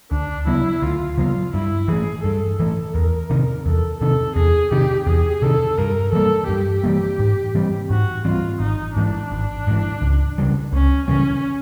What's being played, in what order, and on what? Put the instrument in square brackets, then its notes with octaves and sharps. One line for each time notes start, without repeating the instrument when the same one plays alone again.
[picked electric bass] D2 [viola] D4
[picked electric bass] C#3 F#3 B3 [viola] E4
[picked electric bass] D2 [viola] F4
[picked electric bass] C#3 F#3 B3 [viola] F4
[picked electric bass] G2 [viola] E4
[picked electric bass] E3 A3 [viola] G#4
[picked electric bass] G2 [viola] A4
[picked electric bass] E3 A3 [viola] A4
[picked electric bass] E2 [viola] A#4
[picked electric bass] C3 D#3
[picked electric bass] E2 [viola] A4
[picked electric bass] C3 D#3 [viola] A4
[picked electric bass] E2 [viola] G#4
[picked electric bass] C3 D#3 [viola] G4
[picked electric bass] E2 [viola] G#4
[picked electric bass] C3 D#3 [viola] A4
[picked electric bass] G2 [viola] A#4
[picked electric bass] E3 G3 A#3 [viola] A4
[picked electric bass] G2 [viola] G4
[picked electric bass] E3 G3 A#3
G#2
E3 G3 C4
[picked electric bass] G#2 [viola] F#4
[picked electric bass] E3 G3 C4 [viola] F4
[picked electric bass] G#1 [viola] D#4
[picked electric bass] G#2 E3 [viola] D4
[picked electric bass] G#1
G#2 E3
C#2
E3 G3
C#3
[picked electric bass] C#2 [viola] C#4
[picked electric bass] C#3 E3 G3 [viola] C#4